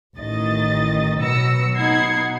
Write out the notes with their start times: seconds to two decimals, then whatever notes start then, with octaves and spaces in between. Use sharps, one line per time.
0.17 A1 D#3 D#5 A6
1.20 B2 F#3 B4 E6 A#6 C#7
1.75 B2 D#4 F#5 B5 G#6 C7